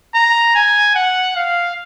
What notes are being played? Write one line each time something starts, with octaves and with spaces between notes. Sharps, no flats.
A#5
G#5
F#5
F5